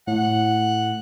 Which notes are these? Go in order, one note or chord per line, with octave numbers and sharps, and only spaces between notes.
A2 F#5